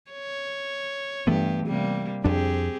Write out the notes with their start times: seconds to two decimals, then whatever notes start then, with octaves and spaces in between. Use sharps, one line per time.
0.11 C#5
1.27 G2 E3 A3 B3 G4
1.67 C3 G3 A#3
2.24 F2 C4 D4 G4 G#4